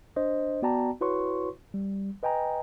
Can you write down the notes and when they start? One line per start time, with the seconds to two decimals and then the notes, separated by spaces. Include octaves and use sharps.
0.16 D4 C5 D#5
0.62 B3 F#4 D5 G5 A5 A#5
1.01 E4 F#4 B4 C#5 C6 C#6
1.74 G3
2.23 B4 D#5 G5 G#5 A#5